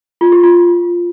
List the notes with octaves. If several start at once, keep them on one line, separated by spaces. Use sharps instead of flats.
F4
G4
F4